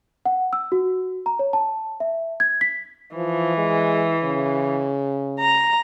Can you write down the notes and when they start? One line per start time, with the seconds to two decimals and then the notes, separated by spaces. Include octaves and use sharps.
0.26 F#5
0.53 E6
0.72 F#4
1.26 A#5
1.39 C#5
1.53 A5
2.00 E5
2.40 G#6
2.61 B6
3.16 E3 F3
3.58 G#3
4.24 C#3
5.40 A#5